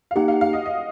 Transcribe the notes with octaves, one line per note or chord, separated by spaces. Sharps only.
F5
A#3 D#4 G4 F#5
F5
F5
D#5
D#5